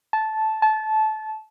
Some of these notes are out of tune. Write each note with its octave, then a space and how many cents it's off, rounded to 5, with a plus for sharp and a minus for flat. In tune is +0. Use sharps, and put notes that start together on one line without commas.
A5 -10
A5 -20